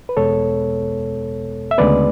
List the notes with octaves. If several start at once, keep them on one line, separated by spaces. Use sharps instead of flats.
B4
E2 B2 G#3 B3 A4 C#5
E5
D2 C#3 G#3 B3 B4 D5